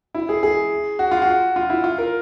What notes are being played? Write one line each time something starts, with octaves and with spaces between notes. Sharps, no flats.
E4
G#4
G#4
F#4
F4
F#4
F4
E4
F4
A#4